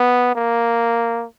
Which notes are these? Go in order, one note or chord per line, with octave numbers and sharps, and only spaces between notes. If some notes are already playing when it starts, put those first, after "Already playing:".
Already playing: B3
A#3